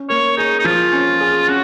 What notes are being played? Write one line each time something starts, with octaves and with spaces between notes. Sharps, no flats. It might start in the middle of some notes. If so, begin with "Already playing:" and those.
Already playing: C#4
A#3 C#5
D#4 G#4
D#4
F3 F4
C#4
G#4
C#4 F#4